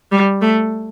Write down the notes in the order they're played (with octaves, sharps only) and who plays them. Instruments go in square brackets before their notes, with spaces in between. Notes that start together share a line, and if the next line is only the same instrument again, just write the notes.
[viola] G3
A3